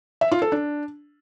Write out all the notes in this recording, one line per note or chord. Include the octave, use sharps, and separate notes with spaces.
E5
F4
A4
D4